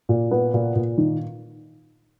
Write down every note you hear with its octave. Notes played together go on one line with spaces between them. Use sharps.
A#2
B3
A#2
A#2
D#3